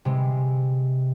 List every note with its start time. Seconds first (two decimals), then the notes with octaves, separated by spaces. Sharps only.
0.05 C3 G#3